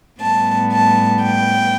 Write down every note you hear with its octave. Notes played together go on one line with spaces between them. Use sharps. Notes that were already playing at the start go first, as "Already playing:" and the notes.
A2 G3 B3 A5
A5
G5